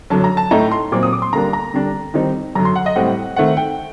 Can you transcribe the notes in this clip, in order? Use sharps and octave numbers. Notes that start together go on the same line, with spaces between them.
F#2 D3 F#3 A5
A#5
A5
A2 A3 D#4 A#5
C6
A#2 F#3 C4 D6
D#6
D6
C6
D3 G3 A#3 D4 A#5
A#5
D3 G3 D4
D#3 G3 C4 D#4
F#2 D3 F#3 A#5
C6
F#5
D#5
A2 G3 C4 F#5
D#3 A3 C4 F#5
G5